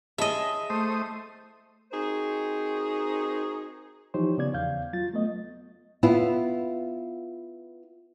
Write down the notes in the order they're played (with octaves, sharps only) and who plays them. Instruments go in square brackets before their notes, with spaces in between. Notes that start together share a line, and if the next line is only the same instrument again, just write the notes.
[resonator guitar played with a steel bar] G#3 E4 A5 [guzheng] D#5 E5
[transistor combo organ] A3 C5 D#6
[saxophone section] C4 D#4 F#4 G#4 A#4 C5
[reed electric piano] E3 F3 D#4 G4 C5 C#5
C#3 B3 D5 G#6
E2 F5 G6
F#3 F4 A6
A3 B3 D#5
[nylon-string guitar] B3 E4 F4